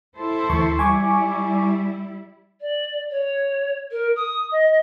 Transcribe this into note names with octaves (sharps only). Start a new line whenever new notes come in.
E4 A4 C5
D2 E3 C#6
G3 E4 G#5 C#6 D6
D5
C#5
A#4
D#6
D#5